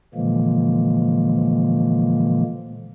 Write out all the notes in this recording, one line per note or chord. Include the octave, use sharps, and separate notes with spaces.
A#2 D3 E3 F3 G#3 A#3